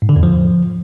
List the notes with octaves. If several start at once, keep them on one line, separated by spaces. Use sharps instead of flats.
G#2
D3
E2
F3